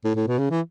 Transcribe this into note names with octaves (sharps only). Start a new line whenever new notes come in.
A2
A2
B2
C#3
E3